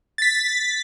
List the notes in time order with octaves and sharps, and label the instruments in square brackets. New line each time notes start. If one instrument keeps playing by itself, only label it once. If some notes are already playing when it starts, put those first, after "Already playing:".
[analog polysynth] A6 B6